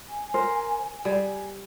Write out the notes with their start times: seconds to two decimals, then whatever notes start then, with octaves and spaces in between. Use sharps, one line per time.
0.09 G#5
0.34 A#4 C5
1.05 G3 G#4